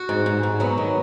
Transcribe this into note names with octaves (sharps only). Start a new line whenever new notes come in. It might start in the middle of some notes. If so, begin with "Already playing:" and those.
Already playing: F#4
G#2
G#2
G#2
F#3 B3
D#3